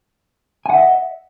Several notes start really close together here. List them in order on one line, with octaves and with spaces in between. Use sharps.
G#5 F#5 E5 D#5